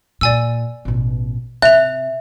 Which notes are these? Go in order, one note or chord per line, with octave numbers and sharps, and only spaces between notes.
A#2 D5 G#5 E6
A1 B2
C3 E5 F#6 F7